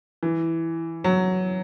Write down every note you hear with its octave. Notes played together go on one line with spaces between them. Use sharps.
E3
F#3